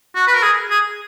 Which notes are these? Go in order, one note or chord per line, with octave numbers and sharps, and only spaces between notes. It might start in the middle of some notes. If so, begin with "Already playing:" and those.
F#4
B4
A#4
G#4
G#4